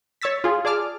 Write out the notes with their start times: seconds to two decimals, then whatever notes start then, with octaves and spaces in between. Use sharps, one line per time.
0.22 C#5 C#6 E6 A6 B6
0.44 F4 G#4
0.65 G#4 D5 A5 D6 F6